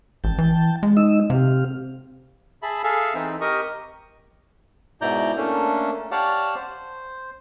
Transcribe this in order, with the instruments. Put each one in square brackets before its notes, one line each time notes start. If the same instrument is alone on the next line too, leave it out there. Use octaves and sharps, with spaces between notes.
[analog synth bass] A1 [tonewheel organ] G5 A5
[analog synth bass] E3
G#3
[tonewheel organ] D#4 D#5 E6
[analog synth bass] C3 [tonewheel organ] C4 G4 F5
[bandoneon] G#4 E5 A5 B5
G#4 A4 E5 F5
E3 C4 D#4
G4 A#4 D#5 C#6 D#6
G#2 B2 E4 D5 A#5 G6
A3 A#3 C#4 D4 A4
G4 C#5 D5 F5 F#5 A5
C5